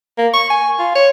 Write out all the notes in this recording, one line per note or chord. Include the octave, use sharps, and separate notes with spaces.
A#3
C#6
G#5
F4
C#5